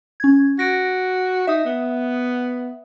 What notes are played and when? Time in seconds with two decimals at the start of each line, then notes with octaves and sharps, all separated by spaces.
0.20 C#4 G#6
0.59 F#4 A#6 D7
1.47 D#4 E5 D#6
1.65 B3